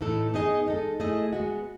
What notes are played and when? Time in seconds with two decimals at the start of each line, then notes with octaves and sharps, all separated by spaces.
0.01 A2 E3 A3 D#4 A4
0.34 B3 D#4 G#4 D#5
0.67 G#3 D#4 A4
1.00 A3 E4 G#4 D#5
1.33 G#3 B3 F#4